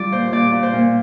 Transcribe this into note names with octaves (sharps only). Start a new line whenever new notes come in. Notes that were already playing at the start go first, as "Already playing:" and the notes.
Already playing: G3 F4 D5
A#2 C5
A#2 D5
A#2
C5
A#2